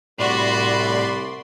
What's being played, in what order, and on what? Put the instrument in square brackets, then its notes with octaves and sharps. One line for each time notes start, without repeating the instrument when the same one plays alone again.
[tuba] C2 [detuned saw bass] A2 [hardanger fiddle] F#4 [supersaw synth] D5 B5 C6